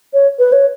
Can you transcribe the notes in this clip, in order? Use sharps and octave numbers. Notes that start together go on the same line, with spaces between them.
C#5
B4
C#5